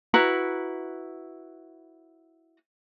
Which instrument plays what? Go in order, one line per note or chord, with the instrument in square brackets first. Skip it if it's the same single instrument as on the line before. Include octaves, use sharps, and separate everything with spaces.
[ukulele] E4 F#4 B4 A#5